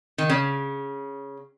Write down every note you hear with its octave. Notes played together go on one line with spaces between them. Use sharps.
D#3
C#3